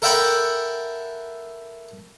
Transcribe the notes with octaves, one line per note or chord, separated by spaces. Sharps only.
A4 A#4 E5 F#5 G5 B5